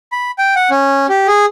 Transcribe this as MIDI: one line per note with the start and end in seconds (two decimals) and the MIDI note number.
0.12 0.31 83
0.38 0.54 79
0.56 0.70 78
0.70 1.07 61
1.09 1.27 67
1.28 1.46 68